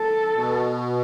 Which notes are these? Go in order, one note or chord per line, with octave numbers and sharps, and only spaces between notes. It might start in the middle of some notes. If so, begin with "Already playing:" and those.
Already playing: A4
B2